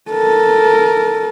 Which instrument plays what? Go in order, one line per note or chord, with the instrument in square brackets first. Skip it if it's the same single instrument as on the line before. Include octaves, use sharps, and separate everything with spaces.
[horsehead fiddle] A4 A#4